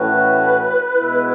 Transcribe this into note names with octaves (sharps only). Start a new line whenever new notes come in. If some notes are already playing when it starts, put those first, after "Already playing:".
Already playing: A2 E3 A3 C#4 F#4 B4
B2 G#3 B3 E4